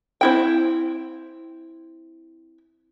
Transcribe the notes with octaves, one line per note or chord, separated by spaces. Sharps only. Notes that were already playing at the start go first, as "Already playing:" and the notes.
C4 E4 G5